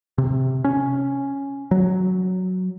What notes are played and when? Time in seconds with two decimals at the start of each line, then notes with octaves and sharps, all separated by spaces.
0.18 C3
0.64 C#4
1.71 F#3